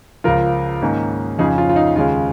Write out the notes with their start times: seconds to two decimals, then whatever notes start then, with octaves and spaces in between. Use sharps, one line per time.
0.24 C#2 C#3 F3 F4 A#4
0.81 G#2 D#3 A#3 C#4
1.38 F2 C#3 F3 C#4 D#4 G#4
1.58 F4
1.69 F4
1.76 D#4
1.95 D#2 C#3 G#3 C#4 F4